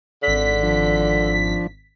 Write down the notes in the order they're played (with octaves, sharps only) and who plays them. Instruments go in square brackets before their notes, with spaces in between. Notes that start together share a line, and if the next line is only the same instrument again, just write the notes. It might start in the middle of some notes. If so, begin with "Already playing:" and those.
[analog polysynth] G#1 B6 [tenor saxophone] D3
[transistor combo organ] F3 D4